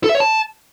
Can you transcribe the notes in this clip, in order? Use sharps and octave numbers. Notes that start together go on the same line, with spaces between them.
A4
E5
C#5
A5